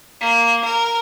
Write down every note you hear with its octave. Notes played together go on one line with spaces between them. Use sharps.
A#3
A#4